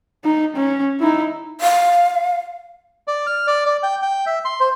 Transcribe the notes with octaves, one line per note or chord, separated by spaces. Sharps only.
D#4
C#4
D#4 E4
F5
D5
F6
D5
D5
G5
G5
E5
C6
C5